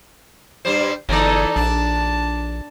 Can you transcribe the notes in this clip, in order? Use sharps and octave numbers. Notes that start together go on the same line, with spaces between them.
G2 G3 C5
G1 E2 D#4 A4 D5
A#1 D4 A5